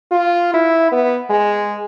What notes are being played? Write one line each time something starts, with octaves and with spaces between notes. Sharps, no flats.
F4
E4
B3
G#3